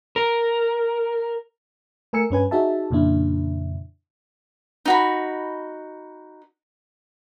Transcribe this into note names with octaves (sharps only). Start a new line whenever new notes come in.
A#4
A3 A#4 G#5 E6 C#7
G2 C#4 B4 G#5
D#4 F#4 G#4 E5 A5
F2 A#2 C#3 D4 E4
D#4 F#4 B5